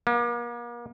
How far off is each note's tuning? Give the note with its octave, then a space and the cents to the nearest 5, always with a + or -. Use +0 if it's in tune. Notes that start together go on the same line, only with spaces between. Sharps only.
A#3 +40